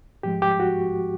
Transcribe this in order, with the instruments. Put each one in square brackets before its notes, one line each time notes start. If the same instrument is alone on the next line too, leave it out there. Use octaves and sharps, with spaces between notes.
[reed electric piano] G#2 F3 G#3 G4
G4
F#4